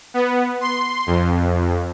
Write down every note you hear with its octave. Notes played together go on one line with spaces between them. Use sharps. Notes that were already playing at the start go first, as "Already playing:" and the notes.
B3
C6
F2